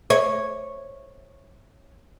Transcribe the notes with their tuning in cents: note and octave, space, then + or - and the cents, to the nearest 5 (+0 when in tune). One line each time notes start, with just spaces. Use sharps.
C#5 -10